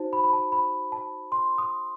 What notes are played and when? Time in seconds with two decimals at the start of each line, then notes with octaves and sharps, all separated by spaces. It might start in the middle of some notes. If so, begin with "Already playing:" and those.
Already playing: D#4 F#4 C5 A5
0.13 B5
0.24 B5
0.33 A5
0.52 B5
0.92 A5
1.32 C6
1.58 D#6